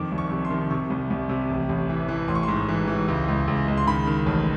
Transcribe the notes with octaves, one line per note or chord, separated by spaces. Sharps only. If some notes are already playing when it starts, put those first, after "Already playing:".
Already playing: F2 D#3 D6
C2
C#6
C3
C6
D#3
C3 C#6
C2
C2
C3
A1
A1
E3
E3
A1 C6
C#6
G#2 C6
E3
E3
C#2
C#2
C#2
C#2
C6
D#3 B5
D#3
A1